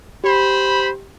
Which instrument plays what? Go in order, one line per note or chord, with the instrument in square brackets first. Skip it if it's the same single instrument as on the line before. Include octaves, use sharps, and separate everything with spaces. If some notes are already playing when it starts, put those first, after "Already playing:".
[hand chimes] G4 [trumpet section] C5 B5